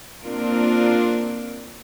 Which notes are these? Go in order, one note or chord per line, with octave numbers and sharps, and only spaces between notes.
A#3 C4 D4 F4 A#4